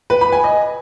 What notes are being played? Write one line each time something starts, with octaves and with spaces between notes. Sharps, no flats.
B4
B5
G#5
D#5